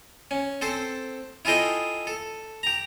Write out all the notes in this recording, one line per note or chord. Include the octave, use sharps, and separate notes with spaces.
C#4
C4 A4 C5 A5
E4 F4 G#4 A4 D#5 G5
A4
G4 A#5